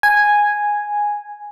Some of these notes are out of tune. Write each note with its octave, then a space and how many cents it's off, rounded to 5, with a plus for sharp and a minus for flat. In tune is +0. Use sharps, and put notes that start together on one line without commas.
G#5 -5